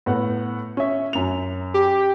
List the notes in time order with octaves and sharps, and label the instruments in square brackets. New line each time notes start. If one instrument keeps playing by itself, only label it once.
[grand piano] A2 B3 F#5
C#4 E5
F#2 F7
[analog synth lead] G4